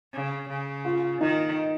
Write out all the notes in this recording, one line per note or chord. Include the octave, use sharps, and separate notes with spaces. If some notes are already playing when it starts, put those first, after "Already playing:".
C#3
C#3
F4
D#3 D#4